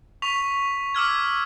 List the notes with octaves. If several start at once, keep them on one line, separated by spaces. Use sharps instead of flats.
C#6 B6 F7
D6 E6 F6 G#6